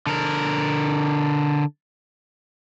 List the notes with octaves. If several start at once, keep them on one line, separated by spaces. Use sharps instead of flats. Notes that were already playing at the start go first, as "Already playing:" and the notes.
D3 A#4